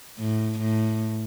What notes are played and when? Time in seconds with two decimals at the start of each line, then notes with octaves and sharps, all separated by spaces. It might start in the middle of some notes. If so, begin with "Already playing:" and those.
0.19 A2
0.59 A2